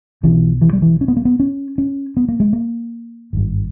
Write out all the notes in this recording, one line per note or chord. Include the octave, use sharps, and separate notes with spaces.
B1 B2 E3
E3
G3
E3
C#4
B3
A#3
B3
C#4
C#4
B3
A#3
G#3
A#3
G#1 G2